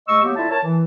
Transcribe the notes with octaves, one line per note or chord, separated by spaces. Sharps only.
G#2 A3 D#5 C#6 E6
F#3 A#3 B3 G4
D3 E4 F4 E5 A5
A#4 C#5 A5
E3